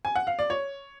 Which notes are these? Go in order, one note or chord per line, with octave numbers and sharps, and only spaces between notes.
G#5
F#5
F5
D5
C#5